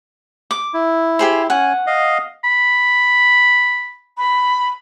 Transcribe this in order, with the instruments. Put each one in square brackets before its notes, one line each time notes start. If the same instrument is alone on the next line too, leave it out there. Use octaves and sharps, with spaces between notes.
[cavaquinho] D6
[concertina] E4
[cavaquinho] G4 G#4 C5
[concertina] C#4 G#5 [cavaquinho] F#5
[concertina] D#5 F5
[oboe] B5
[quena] B5